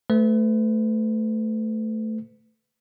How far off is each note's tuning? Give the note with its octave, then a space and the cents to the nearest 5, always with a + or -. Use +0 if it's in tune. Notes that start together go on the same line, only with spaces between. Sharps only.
A3 +0 B4 +35